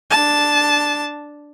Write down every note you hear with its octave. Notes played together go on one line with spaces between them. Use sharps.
D4 A5